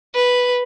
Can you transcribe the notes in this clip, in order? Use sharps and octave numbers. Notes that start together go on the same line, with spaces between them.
B4